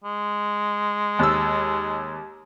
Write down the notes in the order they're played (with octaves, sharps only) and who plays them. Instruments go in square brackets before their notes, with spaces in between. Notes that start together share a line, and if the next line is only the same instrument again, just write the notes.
[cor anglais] G#3
[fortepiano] D#2 E6